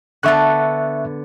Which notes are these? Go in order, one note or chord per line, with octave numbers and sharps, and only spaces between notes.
D3 B3 A4 E5 C#6 F#6